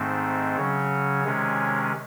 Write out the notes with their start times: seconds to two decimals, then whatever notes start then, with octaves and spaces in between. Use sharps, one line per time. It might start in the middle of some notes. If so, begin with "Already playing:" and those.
Already playing: G#2 D#3 A3 C4
0.56 C#3 F#3 C#4 C#5
1.25 C3 D#3 G#3 C#4